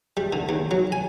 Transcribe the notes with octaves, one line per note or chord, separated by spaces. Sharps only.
G3
D3
D#2
F#3
G#5